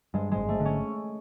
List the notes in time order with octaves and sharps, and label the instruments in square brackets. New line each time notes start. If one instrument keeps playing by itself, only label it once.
[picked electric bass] G2 [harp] G#3
[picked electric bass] G#1 [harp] G#3
[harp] A3
[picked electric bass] D3
[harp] C#4